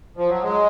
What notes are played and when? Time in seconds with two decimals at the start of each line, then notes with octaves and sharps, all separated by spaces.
0.17 F3
0.29 F#3
0.43 G#3